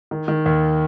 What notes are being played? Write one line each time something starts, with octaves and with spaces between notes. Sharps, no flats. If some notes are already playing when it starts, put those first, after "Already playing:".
D#3
D#3
D#2